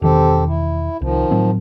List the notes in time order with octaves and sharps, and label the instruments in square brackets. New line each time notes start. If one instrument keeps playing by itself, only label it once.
[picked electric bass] E1 D#3 [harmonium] C4 G4 A4
[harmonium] E4
[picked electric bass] C2 [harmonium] D#3 F3
[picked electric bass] A2 F#3 C4